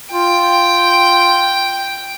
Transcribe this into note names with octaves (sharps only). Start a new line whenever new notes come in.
F4 G5